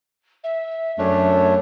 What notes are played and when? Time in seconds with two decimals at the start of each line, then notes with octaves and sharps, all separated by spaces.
0.44 E5
0.98 F#2 A3 D4 C#5